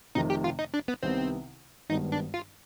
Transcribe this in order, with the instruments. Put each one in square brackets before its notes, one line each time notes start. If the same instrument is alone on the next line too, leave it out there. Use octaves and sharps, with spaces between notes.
[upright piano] F1 F2 C3 D#3 [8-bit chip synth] D#4
[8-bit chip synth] G4
F4
D#4
D4
B3
[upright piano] C2 C3 D#3 B3 [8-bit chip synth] C4
[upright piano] G#1 G2 D#3 B3 [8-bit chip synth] D#4
[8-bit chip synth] D4
F4